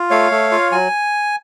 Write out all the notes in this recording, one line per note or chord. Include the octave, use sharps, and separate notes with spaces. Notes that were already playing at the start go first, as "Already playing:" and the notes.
Already playing: F4
A3 C#5 F5
A3
F4
F#3 G#5